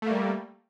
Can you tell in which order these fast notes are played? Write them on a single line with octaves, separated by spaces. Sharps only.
A3 A#3 G3